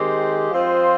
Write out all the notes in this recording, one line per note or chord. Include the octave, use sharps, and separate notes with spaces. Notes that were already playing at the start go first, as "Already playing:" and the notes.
Already playing: D#3 G#3 C4 G4
F3 C4 F4 C5 D#5